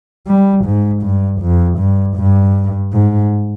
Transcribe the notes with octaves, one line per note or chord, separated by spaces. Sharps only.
G3
G#2
G2
F2
G2
G2
G#2